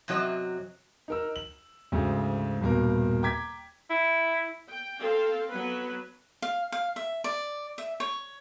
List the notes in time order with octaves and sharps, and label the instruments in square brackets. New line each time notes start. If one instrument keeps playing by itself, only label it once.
[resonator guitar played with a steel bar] F#2 C3 F#3 C#5 D#5
[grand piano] D#4 A#4 E6
F#7
D2 G#2 C#3
D#1 G2 B2 A#3 A#4
G5 A#5 D6 G#6 B6
[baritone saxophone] E4
[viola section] G5
C4 A4 F5
F#3 B3 B4
[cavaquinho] F5
F5
E5
D5
E5
C#5